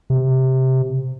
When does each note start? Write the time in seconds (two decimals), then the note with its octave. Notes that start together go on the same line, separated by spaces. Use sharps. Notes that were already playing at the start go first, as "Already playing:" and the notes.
0.10 C3